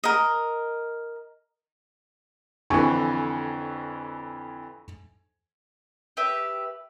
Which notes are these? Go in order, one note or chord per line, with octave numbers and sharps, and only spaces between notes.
A#4 D#5
F2 D3 E3 G#5 C#6
G4 B4 E5